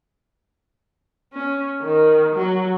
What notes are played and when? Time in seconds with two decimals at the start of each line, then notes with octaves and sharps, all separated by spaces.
1.33 C#4
1.82 D#3
2.35 F#3